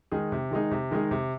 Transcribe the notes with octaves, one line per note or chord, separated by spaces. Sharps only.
D#3 G#3 D#4 G#4
C3
D#3 G#3 D#4 G#4
C3
D#3 G#3 D#4 G#4
C3